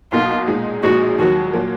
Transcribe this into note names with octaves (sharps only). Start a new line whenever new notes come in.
B1 B2 A#3 D#4 F4
A#2 G#3 D#4
A#1 A#2 G#3 D#4 F#4
D#2 D#3 F#3 F#4
A#2 F#3 A#3